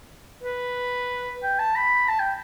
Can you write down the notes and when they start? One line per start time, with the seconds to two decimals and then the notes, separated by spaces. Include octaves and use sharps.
0.43 B4
1.43 G5
1.59 A5
1.76 B5
2.08 A5
2.20 G5